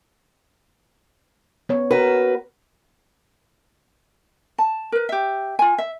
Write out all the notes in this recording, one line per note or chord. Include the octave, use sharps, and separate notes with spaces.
B3 C#5
F#4 A#4 B4
A5
A#4 B4
G4 E5
F4 G#5
E5